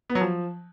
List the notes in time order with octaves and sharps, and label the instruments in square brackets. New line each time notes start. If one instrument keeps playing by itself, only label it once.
[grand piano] B3
F#3
F3